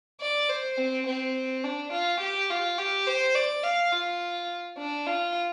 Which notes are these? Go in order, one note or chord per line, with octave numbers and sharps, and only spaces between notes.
D5
C5
C4
C4
D4
F4
G4
F4
G4
C5
D5
F5
F4
D4
F4